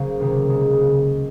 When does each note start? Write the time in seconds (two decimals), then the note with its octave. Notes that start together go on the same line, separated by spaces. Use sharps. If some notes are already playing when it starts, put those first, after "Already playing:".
Already playing: C#3 F#3 A#3 C5
0.20 C#2 C3 D#3 A#4
0.49 C#3 G#3